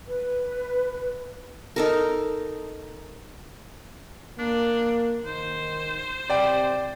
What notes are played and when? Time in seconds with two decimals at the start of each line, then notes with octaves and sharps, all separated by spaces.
0.07 B4
1.76 D#4 A4 A#4
4.39 A#3 D4
5.26 D#3 C5
6.30 C3 D5 G5